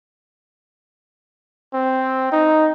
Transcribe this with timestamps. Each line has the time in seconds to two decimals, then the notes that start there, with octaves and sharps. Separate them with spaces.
1.74 C4
2.32 D#4